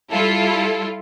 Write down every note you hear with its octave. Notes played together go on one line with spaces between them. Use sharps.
G3 E4 F4 A4